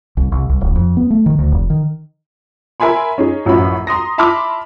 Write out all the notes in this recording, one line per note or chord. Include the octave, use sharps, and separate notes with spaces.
C2
C2
C2
D1
F2
B3
A3
D#3
D2
F1
D#3
A#4 E5 G#5 B5 C6
C#4 D#4 G#4
A1 F#2 F3 C#4 B5
A#5 C6 D#6 A#6
E5 A5 B5 C6 D6 F6